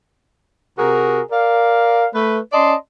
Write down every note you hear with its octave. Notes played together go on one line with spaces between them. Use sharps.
C3 F#4 G#4 A#4
A#4 D5 F5
A3 B4
C#4 D5 D#5 A5 C6